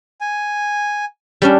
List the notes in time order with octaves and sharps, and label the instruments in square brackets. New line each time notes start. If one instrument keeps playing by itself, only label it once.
[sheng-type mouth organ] G#5
[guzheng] G3 C#4 D4